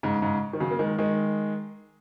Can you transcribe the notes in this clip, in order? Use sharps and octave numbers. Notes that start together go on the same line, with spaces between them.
G#2 C#3
G#2 C#3
D#3
C#3 F#3
A#3
D#3 G#3
D#3 G#3